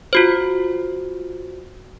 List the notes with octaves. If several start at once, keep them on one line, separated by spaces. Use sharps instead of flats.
F4 F#4 C5